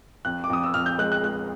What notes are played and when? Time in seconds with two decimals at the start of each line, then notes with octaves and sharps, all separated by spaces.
0.25 F2 F#6
0.44 D6
0.50 F2 D#6
0.63 E6
0.74 F2 F6
0.86 G6
0.99 G#3 F#6
1.12 F#6
1.24 G#3 F#6